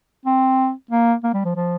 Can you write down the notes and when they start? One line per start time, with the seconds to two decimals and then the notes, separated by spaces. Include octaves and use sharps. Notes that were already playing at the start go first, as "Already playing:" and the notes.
0.26 C4
0.91 A#3
1.24 A#3
1.34 G3
1.45 F3
1.56 F3